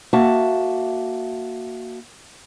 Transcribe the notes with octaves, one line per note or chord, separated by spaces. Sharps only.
A#3 F#4 E5 A5